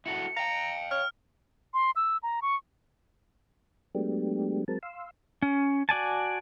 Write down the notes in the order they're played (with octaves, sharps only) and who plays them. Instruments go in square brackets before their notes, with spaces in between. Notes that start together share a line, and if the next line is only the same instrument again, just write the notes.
[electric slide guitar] E4 F#4 A4 [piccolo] C#7
[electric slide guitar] F5 G5 [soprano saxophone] A#5
[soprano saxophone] C#5 [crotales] F6
[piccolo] C6
E6
A#5
C#6
[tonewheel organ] F#3 G#3 A3 B3 D4 G4
F#3 G#3 C4 A#4 A5
F5 C6 E6
[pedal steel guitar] C#4
F#4 D5 G#5 A5